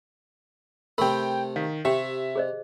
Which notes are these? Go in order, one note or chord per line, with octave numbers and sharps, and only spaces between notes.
C3 A3 A#4 G5 B5
D#3 F5
C3 G4 E5 G5
G#4 C5 D#5